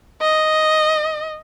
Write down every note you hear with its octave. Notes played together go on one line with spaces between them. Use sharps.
D#5